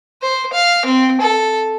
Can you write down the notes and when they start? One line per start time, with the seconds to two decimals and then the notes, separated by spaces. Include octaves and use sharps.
0.22 C5
0.53 F5
0.86 C4
1.21 A4